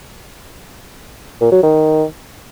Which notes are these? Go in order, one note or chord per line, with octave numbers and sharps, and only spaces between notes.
A#2
F#3
D#3